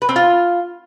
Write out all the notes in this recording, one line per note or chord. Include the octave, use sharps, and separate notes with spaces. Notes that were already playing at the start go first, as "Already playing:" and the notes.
B4
C4
F4